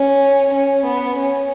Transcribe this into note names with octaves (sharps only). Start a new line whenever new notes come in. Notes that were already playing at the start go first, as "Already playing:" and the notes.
Already playing: C#4
C#4
B3
C#4